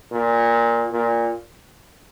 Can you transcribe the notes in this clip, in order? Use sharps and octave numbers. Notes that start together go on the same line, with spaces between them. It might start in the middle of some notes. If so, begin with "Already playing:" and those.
A#2
A#2